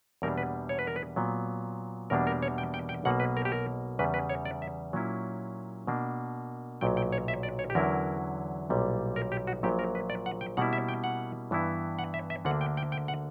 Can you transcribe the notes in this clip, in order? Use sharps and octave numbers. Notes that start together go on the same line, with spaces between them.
E2 B2 G3 A#3 D4 A#4
B4
C#5
B4
A#4
B4
A#2 F#3 B3
E2 B2 G3 A#3 D4 A#4
A#4
C#5
G5
G5
G5
B1 B2 A#3 F#5
B4
A#4
G4
A#4
E2 C#3 G3 B4
B4
C#5
D5
E5
A#2 F#3 A#3 C#4 E4
B2 A#3 D4
B1 A#2 F#3 G5
G5
C#5
E5
D5
C#5
G4
E2 D3 F#3 C#4 E4 A#4
B1 A#2 G3 C#4
A#4
G4
F#4
A#1 A#2 F#3 G4
A#4
B4
D5
F#5
G5
B2 G3 A#3 C#4 E4 F#5
E5
G5
F#5
G2 E3 B3 E4
F#5
E5
E5
D2 D3 A#3 D4 F#5
G5
G5
G5
F#5